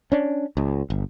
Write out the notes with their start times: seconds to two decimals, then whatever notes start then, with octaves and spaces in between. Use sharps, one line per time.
0.12 C#4 D4
0.57 C#2
0.90 G1